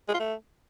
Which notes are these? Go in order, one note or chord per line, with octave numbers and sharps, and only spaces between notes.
G#3
F4
A3